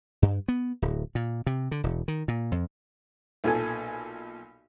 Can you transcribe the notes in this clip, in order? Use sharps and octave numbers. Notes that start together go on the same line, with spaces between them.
G2
B3
D1
A#2
C3
D3
E1
D#3
A#2
F2
B1 A#2 A4 G#5